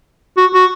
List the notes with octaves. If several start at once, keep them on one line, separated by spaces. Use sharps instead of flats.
F#4
F#4